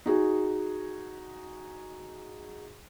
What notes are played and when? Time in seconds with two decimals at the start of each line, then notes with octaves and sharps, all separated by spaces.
0.06 D#4 F#4 G#4